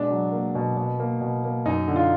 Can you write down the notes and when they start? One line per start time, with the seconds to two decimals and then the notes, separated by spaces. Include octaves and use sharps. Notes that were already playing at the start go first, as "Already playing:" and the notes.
Already playing: B2 G#3 D4
0.10 F#3
0.32 A#3
0.55 B2
0.77 B2
1.00 A#3
1.21 B2
1.44 A#3
1.66 F#2 D#4
1.88 D3
1.96 F4